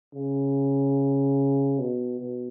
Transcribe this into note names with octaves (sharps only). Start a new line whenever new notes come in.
C#3
B2
B2